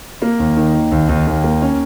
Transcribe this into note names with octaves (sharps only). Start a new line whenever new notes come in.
A#3
D#2
D#3
D#3
D#2
D#2
D#2
A#3
C#4